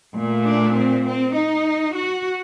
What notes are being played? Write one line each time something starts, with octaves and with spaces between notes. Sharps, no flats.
A#2 A3
D4
C4
C4
D#4
F#4